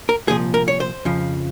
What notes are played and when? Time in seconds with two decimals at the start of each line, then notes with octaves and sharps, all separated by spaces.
0.09 A#4
0.28 C2 A#2 F3 G#4
0.54 A#4
0.68 C#5
0.80 C5
1.05 F2 C#3 F3